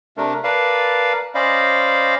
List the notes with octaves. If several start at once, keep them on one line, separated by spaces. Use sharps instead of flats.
C3 A3 D4 A#4
A#4 B4 D5 F5 A5
C#4 C5 D5 D#5 F5 B5